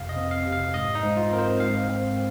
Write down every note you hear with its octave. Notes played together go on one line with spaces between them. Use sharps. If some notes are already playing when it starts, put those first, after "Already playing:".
Already playing: F2 C3 F5
D#5
C4
F5
C3
F5
G#2 D#5
D#4
G#2
F4
C4 A#4
C5
G#2 F5
C4